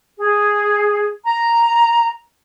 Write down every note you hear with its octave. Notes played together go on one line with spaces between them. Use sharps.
G#4
A#5